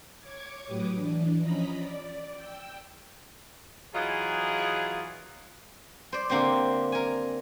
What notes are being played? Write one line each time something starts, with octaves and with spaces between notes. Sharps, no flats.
C#5 C#6 D6 G#6
A2 F#3 G4 B4 D6 D#6
E3 D4
F3 C#4 D#5 A#5 B5 B6
D5
G5 E6
E3 F#3 D#4 F4 G#4
C5 D5
D3 A#3 C4 G4 C5
A#4 G#5